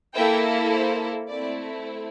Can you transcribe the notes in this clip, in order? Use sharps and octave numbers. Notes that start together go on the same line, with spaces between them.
A#3 E4 A4 E5 G5
C5
A3 C4 E4 D5